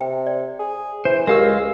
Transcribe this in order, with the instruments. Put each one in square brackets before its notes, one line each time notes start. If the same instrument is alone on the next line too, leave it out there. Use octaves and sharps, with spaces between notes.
[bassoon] C3 [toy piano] G5
[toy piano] D5
[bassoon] G#4
[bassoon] E3 [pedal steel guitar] C5
[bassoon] C#2 [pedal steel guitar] G#3 F5 E6 [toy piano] G4 A#4